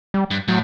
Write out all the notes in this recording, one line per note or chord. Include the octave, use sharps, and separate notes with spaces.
G3
G2
A2 F#3